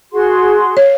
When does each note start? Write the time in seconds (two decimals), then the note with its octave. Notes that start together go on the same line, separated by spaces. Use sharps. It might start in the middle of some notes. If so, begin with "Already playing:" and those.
0.11 F#4 G#4 C6
0.77 C#5 F5